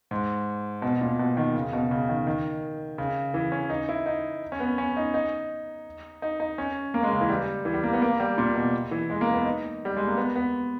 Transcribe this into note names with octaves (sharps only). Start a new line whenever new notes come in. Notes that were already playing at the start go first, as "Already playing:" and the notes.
G#2
B2
A#2
B2
D#3
C#3
B2
C#3
D#3
D#3
C#3
E3
C#4
D#4
E4
D#4
C#4
B3
C#4
D#4
D#4
D#4
D#4
C#4
A#3
G#3
C#3
E3
G3
E3
G3
A#3
B3
A#3
G3
A#2
B2
E3
G#3
A#3
B3
D#4
G3
G#3
A#3
B3
B3